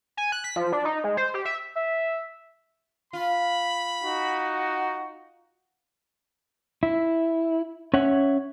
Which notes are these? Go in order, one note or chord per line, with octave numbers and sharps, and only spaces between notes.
G#5
F#6
B6
F3
D4
D#4
G#3
C5
G4
E5
E5
F4 B5
D#4 F#4 F#5
E4
C#4 C#5 E5 F#5